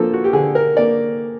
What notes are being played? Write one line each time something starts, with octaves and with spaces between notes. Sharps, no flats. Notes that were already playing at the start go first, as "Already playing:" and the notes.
Already playing: F3 A#3 A4
F#4
G4
D3 G#4
A#4
A#3 D5